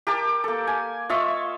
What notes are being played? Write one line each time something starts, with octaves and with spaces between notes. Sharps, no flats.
G4 A#4 A5 D6
A#3 A4
G#5
F4 D#5 E5 C#6